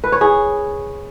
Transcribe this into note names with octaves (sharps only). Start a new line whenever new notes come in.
B4
C#5
G#4